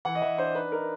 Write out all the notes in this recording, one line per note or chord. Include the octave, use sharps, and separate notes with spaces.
E3 F#5
D#5
E3 E5
D4 C5
D#4 B4
D#4 A#4